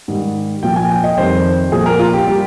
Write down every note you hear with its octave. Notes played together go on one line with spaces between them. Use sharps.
G#2 D#3 G3
A#2 F3 G5
G#5
G5
D#5
F2 D#3 G3 C5
A#2 F3 G#4
A#4
F4
G4
G3 G4